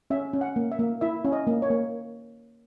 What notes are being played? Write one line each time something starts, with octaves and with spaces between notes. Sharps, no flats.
C#4 E5
C#4
F#5
A#3
E5
A#3
E4 E5
C#4
D#5
A#3
C#5
A#3